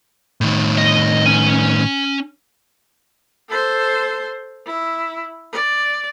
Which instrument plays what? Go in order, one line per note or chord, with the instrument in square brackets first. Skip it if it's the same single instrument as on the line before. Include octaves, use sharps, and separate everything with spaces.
[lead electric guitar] A2 D#3
[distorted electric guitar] D#5
C#4 G#5
[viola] A4 C5
E4
D5